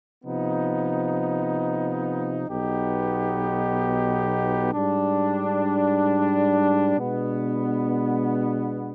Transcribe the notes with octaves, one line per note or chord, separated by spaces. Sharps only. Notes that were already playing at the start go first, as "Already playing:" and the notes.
C3 F3 B3 D#4
B1 B2 B3 D#4 G4
G#2 G3 D4
B2 G#3 B3 D4